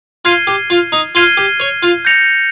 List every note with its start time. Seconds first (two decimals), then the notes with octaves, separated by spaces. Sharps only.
0.25 F4 F6 G#6 C7 D#7 G7
0.47 G4
0.70 F4
0.92 D#4
1.15 F4 F6 G#6 C7 D#7 G7
1.37 G4
1.60 C#5
1.83 F4
2.05 G6 A#6 C#7 F7